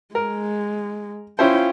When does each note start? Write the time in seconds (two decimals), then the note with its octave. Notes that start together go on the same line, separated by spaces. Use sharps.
0.15 G#3 A#4
1.39 C#4 E4 F4 C5 G5